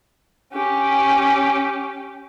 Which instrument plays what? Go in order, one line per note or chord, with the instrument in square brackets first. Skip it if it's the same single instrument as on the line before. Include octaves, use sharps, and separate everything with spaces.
[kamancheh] C#4 G4